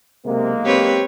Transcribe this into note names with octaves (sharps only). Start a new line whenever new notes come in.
B1 C3 G#3 A#3
C4 G4 B4 C#5